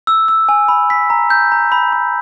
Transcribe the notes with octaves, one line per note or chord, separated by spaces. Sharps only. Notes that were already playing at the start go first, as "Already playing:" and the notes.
E6
E6
G#5
B5
B6
A#5
G6
A#5
B5
B5